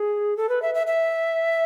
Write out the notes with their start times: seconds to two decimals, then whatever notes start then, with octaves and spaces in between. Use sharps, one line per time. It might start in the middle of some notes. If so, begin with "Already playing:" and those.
Already playing: G#4
0.37 A4
0.49 B4
0.62 E5
0.75 E5
0.87 E5